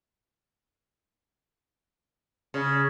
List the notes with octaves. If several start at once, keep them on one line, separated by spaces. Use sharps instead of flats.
C#3